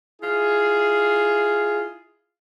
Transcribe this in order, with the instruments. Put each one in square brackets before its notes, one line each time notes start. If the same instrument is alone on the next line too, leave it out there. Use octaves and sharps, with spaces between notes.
[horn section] E4 F4 G#4